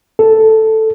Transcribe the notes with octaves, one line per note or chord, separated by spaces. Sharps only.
A4